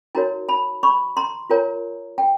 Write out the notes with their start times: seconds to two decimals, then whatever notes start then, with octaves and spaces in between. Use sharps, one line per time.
0.15 D#4 F#4 A#4 C#5 G#5 A#5
0.49 A5 B5
0.83 B5 C#6
1.17 A#5 C6
1.50 F4 A#4 C#5 G#5 A#5
2.18 G5 A5